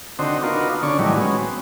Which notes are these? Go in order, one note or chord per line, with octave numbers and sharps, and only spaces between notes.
D3 C4 D#4 F#4 C5
B3 D4 D#4 F4 F#4 A#4
D3 C#4 D5 C#6
A2 D#3 E3 F#3 G3
G#3 B3 C#4 F#4
C4